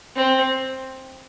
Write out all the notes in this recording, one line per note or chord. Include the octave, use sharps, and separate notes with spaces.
C4